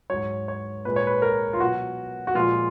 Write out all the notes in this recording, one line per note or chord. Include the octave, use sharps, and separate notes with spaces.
G#2 F#3 C#5
C#5
A#2 G#3 B4
C#5
B4
A#4
F4
B2 F#3 F#4
F#4
A#2 F3 G#3 F4